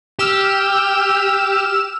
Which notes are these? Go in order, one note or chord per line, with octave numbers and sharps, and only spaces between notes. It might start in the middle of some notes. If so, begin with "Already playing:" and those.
G4 E6 F6 E7